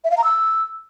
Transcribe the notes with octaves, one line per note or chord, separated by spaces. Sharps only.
E5
F5
A#5
E6